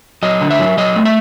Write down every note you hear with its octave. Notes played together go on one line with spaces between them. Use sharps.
F#3 D#5
D3
E5
F#3
F#3 D#5
A3
E5